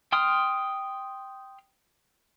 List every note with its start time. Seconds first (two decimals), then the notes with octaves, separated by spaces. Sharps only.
0.12 G5 C6 D#6 F6